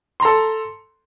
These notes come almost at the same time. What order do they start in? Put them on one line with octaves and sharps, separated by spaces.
C6 A#5 A4